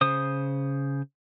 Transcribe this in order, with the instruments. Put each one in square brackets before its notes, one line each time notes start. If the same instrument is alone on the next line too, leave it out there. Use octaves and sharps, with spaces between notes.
[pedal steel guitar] C#3 C5 D#6